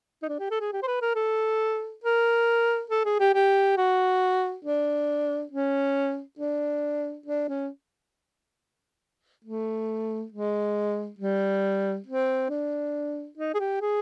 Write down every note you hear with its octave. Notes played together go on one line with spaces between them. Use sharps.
D#4
D4
G4
A4
G#4
G4
C5
B4
A#4
A4
A#4
A4
G#4
G4
G4
F#4
D4
C#4
D4
D4
C#4
A3
G#3
G3
C4
D4
D#4
G#4
G4
G#4